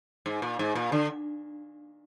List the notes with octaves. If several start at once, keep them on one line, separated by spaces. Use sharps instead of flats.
G#2
A#2
G#2
A#2
D3